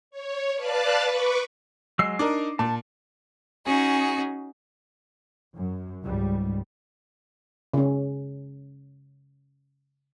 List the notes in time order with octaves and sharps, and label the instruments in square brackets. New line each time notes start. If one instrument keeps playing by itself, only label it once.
[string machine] C#5
B4 D5 F5 A5 F#6 A6
B4 C#6 D6
[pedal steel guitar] F#3 G#3 E6 [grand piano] C7
[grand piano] D4 D#4 A#4 [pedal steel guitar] D6
[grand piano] A#2 [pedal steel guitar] A5
[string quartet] C#4 D#4 F#4 G#4
[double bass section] F#2
C#2 G#2 G3
[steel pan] C#3 C#4